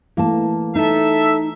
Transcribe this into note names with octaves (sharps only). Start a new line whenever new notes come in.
E3 A3 A#3 A5
D#4 A4 E5